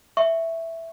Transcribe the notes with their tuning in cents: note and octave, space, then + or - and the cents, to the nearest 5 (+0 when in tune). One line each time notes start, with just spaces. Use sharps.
E5 +0 C#6 +0